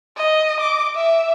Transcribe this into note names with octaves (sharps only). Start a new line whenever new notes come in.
D#5
D6
E5